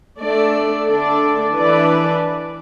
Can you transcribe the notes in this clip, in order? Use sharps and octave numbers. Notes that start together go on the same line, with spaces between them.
A3 D4 A4 D5
D3 A3 D4 A4 D5
E3 D4 B4 D5